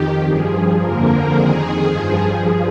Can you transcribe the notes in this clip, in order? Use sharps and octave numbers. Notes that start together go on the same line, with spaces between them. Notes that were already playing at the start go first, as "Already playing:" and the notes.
Already playing: F2 D#3 G4
G2 F3 G#4
F2 D3 F3 A#3 A#4
F2 D#3 G#4
G2 F3